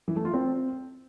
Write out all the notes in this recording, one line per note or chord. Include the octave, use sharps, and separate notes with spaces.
E3
A3
F4
C4